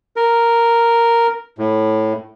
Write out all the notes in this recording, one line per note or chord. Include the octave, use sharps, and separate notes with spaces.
A#4
A2